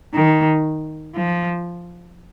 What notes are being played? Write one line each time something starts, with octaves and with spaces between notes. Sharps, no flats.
D#3
F3